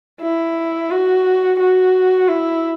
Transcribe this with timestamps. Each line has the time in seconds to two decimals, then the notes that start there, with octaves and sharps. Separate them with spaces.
0.21 E4
0.90 F#4
1.59 F#4
2.28 E4